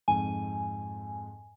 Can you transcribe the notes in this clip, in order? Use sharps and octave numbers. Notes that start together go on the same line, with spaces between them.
F2 G#2 G#5